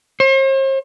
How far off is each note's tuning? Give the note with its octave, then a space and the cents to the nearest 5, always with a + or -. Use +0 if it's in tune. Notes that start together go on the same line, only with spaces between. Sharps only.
C5 +45